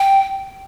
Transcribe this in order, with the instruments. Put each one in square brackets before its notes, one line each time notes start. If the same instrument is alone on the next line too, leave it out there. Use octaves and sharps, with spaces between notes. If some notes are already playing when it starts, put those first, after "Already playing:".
Already playing: [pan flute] G5